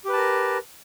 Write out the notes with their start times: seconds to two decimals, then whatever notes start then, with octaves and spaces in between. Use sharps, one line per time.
0.05 G4
0.09 B4
0.13 A5
0.17 A#4